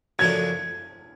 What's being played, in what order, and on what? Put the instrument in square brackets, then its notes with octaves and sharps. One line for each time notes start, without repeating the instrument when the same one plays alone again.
[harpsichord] F#2 C#3 F3 A3 D4 [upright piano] G#6